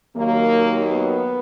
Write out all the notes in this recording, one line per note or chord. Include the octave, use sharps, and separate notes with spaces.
D#2 D#3 F#3 A#3
B3